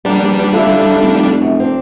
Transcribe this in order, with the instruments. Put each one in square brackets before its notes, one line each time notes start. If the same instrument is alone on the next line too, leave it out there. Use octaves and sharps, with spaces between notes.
[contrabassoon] A#1 [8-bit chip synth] G3 D4 [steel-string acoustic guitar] B3 A#5
[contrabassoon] D3 [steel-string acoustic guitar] E4 F4 A4
[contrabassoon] F1
[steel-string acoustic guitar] F#2
C4 D4